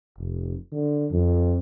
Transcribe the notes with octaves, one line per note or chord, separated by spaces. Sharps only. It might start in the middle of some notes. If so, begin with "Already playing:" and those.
F1
D3
F2